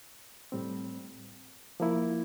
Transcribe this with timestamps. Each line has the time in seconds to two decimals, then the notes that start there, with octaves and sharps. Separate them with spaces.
0.52 A2 G3 C4
1.80 F3 A#3 E4